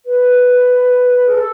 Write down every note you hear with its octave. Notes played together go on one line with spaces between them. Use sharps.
B4
G#4
A4